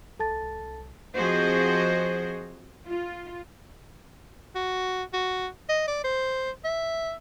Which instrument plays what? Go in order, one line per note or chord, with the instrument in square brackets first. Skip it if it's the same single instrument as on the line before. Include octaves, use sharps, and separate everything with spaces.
[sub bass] C2 [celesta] A4 A5 A6
[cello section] F3 C4 F#4 G#4 C5 D#5
F4
[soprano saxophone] F#4
F#4
D#5
D5
C5
E5